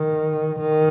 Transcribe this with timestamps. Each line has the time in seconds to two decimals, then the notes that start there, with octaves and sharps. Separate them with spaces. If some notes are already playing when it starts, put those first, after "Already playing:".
Already playing: D#3
0.60 D#3